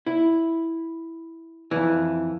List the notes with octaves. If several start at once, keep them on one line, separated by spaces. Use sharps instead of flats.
E4
F2 E3